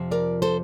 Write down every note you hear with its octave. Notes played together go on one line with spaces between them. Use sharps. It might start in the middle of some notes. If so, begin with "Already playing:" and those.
Already playing: F2 C3 F3
A#4 D5
A4 C5